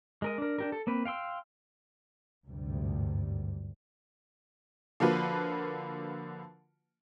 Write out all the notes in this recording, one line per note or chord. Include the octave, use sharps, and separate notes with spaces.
G#3 A#4 D#5
D4 A#4
D4 G4 A#4
A4
A#3 C4 B4
F5 G5 C6 E6
G#1 D2 G2 C3 G3
D3 F3 A#3 F4 F#4 B4